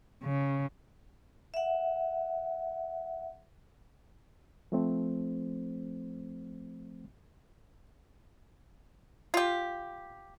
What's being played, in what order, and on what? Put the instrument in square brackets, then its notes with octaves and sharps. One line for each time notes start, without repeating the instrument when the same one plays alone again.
[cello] C#3
[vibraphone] E5 F#5
[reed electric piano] F3 A3 C4 C5
[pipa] F4 G4